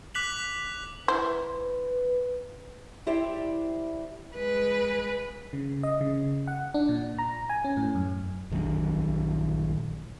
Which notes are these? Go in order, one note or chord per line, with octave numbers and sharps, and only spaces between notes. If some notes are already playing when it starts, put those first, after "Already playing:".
D6 F#6 B6 F7 F#7
E4 B4 C5
E4 G4 C5 D5 E5
G#3 B4
C#3
D#5
C#3
F#5
D4
A#2
A#5
G#5
C#4
A2
F#2
A#1 D#3 F#3 D4